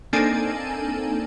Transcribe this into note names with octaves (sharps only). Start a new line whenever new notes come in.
A#3 C4 D4 D#4 A4 G#5